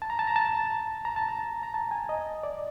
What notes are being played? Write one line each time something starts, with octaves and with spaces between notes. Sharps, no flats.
A5
A#5
A5
A#5
A5
A#5
A5
A#5
A#5
A5
G#5
D#5
D5